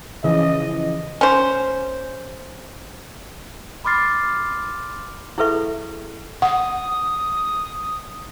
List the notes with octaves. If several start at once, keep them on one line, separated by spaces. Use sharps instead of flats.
C#3 E3 F3 D#5
C#4 C5
B5 C6 D6 F6 A6 C7
E4 G#4 A4 B4 E5 C#6
F#5 D#6